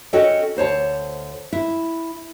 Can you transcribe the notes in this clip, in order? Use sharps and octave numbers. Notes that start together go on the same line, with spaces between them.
C#4 F#4 A4 C#5 D#5 G5
D2 C5 C#5 A5
E4